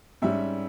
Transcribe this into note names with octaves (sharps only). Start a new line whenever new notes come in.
G#2 G3 C#4 E5